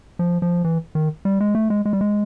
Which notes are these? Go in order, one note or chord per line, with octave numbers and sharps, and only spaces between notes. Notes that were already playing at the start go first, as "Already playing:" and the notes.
F3
F3
E3
D#3
G3
G#3
A3
G#3
G#3
G3
G#3